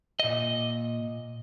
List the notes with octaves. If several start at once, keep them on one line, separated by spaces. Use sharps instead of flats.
A#2 D#5